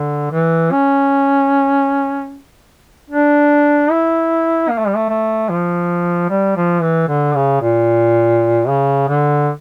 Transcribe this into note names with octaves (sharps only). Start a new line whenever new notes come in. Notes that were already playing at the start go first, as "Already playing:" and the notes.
Already playing: D3
E3
C#4
D4
E4
A#3
A3
G3
A3
A3
F3
G3
F3
E3
D3
C#3
A#2
C#3
D3